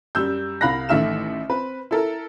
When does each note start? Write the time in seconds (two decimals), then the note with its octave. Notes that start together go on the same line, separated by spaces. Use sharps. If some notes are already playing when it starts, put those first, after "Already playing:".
0.15 F#2 G3 E6 G6
0.61 C2 F5 B5 F#6 A#6
0.89 A1 D#3 A3 E5 F6 E7
1.49 C4 B4
1.91 E4 A4 A#4